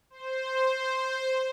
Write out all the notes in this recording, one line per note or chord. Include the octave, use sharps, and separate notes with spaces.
C5